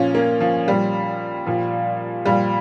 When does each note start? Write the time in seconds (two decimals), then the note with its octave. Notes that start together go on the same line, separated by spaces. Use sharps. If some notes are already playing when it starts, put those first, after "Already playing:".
Already playing: A#2 F3 C#4
0.14 A#3
0.40 F3
0.67 A#2 F3 G3
1.46 A#2 F3
2.25 A#2 F3 G3